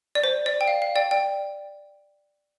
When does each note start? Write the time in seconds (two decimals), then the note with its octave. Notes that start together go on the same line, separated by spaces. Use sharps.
0.15 D5
0.24 C5
0.46 D5
0.61 G5
0.68 F5
0.82 F5
0.96 D5 G5
1.11 D5 G5